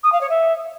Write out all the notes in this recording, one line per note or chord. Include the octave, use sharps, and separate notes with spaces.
D#6
F5
C#5
E5